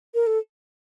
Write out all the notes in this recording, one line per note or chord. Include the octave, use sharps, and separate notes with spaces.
A#4
A4